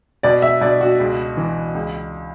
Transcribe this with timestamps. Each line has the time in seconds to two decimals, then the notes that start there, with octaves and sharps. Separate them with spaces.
0.23 B2 D5
0.42 E5
0.61 B2 D5
0.81 F#4
0.99 C#2
1.37 E3
1.75 C#2